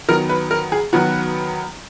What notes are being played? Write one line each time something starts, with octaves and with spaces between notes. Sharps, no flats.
D#3 F#3 B3 A#4
B4
A#4
G#4
D#3 F#3 B3 F#4